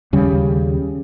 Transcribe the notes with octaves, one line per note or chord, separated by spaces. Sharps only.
D#2 C#3 G3